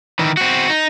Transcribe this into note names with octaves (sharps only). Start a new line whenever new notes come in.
D#3 E3
C4 F#4
D#4